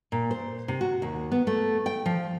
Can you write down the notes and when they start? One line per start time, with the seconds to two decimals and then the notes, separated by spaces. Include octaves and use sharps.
0.12 A#2
0.31 C5
0.68 C3
0.81 F#4
1.02 D#2
1.32 B3
1.47 A3
1.86 G5
2.06 F3